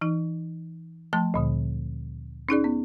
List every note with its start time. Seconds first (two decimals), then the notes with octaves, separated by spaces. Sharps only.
0.01 E3 D#4
1.13 F3 A3 A5 C6
1.34 D2 A#2 D3
2.49 C#4 D#4 G#4 D5
2.64 B3